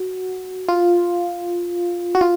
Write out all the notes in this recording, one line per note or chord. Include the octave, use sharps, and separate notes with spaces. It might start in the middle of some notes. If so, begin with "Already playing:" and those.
Already playing: F#4
F4
F#4
F4